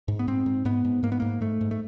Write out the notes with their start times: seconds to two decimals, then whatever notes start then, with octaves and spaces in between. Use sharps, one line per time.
0.08 G#2
0.19 B3
0.27 G#2 C4
0.46 G#2
0.65 G#2 B3
0.85 G#2
1.03 G#2 A#3
1.12 B3
1.20 G#2 A#3
1.41 G#2 A3
1.61 G#2
1.71 A3